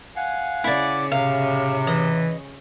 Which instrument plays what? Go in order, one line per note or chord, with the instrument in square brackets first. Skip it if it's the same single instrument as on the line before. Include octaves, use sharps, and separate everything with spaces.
[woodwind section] F5 F#5 G#5
[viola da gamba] C#3 [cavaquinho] E4 D5
[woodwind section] A2 C3 [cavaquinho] F5
[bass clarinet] E3 [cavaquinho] D#5